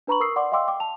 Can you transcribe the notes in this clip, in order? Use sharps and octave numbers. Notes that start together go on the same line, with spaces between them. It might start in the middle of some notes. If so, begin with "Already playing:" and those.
D4 B4 A#5 B5 C#6 F#7
A#4 C#6 D#6 E6 C7
D5 F#5 C6 D6
D#5 F5 G5 C6 D6 E6
G5 D6
A5 F7